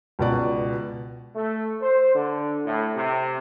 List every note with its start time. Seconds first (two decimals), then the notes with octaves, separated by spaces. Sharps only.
0.19 C#2 B2 D5
1.35 A3
1.80 C5
2.14 D3
2.65 A2
2.95 C3